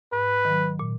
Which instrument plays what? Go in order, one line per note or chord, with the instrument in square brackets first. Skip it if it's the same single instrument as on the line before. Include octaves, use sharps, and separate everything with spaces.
[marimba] G#2 [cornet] B4
[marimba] D#3 F#3
A#2